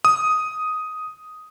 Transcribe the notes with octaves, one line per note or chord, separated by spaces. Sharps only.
D#6